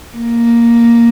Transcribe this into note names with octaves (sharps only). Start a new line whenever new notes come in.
A#3